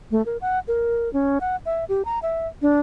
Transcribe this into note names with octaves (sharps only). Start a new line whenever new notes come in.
A3
A#4
F#5
A#4
C#4
F#5
E5
G4
A#5
E5
D4